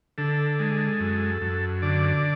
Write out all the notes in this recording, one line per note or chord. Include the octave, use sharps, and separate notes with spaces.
D3 A4
G#3
F#2
F#2
D3 D5